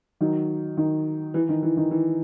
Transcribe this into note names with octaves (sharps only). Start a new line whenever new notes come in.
D#3 F#3
D#3
E3
D#3
E3
D#3
E3